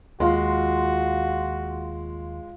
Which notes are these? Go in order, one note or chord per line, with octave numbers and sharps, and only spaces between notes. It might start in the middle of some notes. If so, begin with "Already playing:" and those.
D#2 G#3 F4 F#4 C6